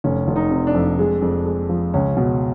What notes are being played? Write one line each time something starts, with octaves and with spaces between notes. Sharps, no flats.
F1 C#4
F1
D#4
C3
D4
F2
G#3
F2
G#3
F3
C#2 C#4
B2